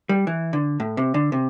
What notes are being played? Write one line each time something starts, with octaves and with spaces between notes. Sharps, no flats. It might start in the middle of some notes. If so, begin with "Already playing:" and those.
G3
E3
D3
A2
C3
D3
C3